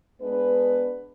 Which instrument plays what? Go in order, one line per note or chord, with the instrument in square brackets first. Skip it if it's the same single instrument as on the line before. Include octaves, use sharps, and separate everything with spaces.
[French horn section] G#3 B3 D4 B4